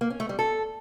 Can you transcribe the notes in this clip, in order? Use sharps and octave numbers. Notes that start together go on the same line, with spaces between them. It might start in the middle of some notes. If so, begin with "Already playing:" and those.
A#3
C#4
A3
G3
A4